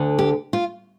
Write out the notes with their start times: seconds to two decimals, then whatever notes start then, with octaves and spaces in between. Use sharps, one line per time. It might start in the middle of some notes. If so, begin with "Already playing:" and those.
Already playing: D2 D3
0.19 G4
0.53 F4